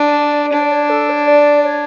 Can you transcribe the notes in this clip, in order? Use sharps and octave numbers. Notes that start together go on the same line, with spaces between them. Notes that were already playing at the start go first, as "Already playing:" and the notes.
Already playing: D4
D5
D4 C#5
D5
C#5
A4
C#5
D5
C#5